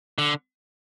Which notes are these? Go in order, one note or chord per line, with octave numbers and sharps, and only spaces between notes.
D3